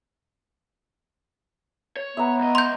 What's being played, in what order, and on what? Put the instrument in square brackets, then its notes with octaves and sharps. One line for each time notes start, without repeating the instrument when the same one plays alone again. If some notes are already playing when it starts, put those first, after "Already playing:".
[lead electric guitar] C#5
[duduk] B3 [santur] E5 A#5
[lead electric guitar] C#2 D#5
[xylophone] C6 G6